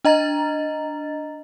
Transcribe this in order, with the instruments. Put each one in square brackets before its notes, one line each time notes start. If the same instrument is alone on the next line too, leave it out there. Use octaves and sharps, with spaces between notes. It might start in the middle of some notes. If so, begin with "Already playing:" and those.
[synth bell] D4 D#5 A#5 A6